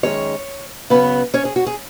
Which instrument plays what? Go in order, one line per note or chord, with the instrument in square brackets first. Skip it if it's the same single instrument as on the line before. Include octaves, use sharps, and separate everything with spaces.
[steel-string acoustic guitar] F#2 D#3 G#3 C#4 C#5
C#3 F#3 B3 C#4 B4
C#4 C#5
G#4
F#4
G#4